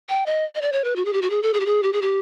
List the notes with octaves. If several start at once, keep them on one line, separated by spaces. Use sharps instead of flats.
G5
D#5
D#5
D5
C#5
B4
F#4
G#4
G4
F#4
G#4
A4
G#4
G4
G#4
G4
G#4
G4